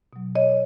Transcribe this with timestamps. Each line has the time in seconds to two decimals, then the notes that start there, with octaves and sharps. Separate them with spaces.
0.13 B2 F#3
0.35 C#5 D#5